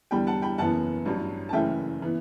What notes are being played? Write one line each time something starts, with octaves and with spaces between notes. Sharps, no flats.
E2 D3 G3 G5 B5
F#5 A5
G5 B5
F#1 F#2 E3 B3 F#5 A5
A1 G2 F#3
A5
F#1 F#2 C#3 E3 A3 E5 G5
E3 B3